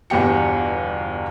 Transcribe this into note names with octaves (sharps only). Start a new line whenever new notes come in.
G1 E2 B2 G4 C#7